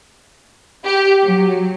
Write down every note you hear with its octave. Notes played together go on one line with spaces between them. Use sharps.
G4
F#3